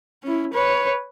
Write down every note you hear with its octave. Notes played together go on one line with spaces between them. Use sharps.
C#4 E4
B4 C#5